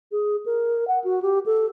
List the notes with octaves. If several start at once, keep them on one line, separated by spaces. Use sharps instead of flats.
G#4
A#4
F#5
F#4
G4
A4